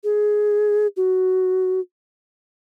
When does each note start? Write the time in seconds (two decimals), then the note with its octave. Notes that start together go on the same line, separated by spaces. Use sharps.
0.04 G#4
0.97 F#4